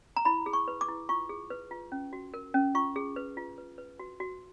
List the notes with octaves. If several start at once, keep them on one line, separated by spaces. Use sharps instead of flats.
A#5
E4 B5
G#4
C#6
B4
D6
E4
F4 C#6
G#4
B4
F4
C#4
F#4
A#4
C#4
F4 C#6
G#4
B4
F4
B4
B4
F#4
F#4